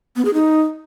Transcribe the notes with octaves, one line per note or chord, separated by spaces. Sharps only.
B3
G#4
D#4